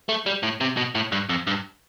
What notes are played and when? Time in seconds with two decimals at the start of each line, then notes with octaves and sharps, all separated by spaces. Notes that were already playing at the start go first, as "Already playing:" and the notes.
0.09 A3
0.26 G3
0.43 A2
0.61 C3
0.77 B2
0.95 A2
1.12 G2
1.29 F2
1.47 G2